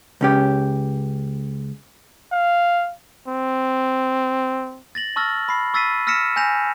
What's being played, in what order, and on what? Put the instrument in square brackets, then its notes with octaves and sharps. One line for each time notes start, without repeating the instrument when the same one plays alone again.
[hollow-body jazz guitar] C#2 C#4 G4
[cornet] F5
C4
[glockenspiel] A6 A#6 F#7
A5 C#6 E6 F6 A6 A#6
B5 C7
C#6 E6 A6 B6 C7 D#7
E6 F6 A#6 B6 C#7 E7
G#5 G6 A#6 F7